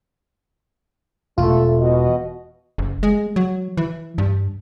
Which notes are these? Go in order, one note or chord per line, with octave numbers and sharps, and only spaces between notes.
E1 A3 F4
B2 F#4 D#5
F#1
G#3
F#3
E3
G2